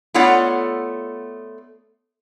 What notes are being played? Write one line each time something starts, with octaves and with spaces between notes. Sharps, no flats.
A3 B3 F4 C#5 D5 F#5